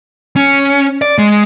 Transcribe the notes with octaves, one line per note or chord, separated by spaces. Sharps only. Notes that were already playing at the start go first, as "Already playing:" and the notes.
C#4
D5
G#3